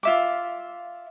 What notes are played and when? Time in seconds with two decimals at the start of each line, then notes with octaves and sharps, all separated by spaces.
0.03 F4 E5 D6